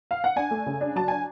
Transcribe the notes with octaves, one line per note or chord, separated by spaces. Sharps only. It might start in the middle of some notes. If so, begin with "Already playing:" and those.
F5
F#5
D4 G#5
A3
C#3
D4
F#3 A5
D4 G#5